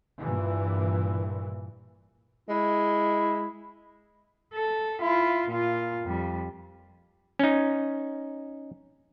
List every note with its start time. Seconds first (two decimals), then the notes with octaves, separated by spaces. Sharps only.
0.22 G2 A#2 E3
2.49 G#3 E4
4.54 A4
5.02 E4 F4
5.49 A#2 F4
6.04 F2 G3
7.39 C#4 D#4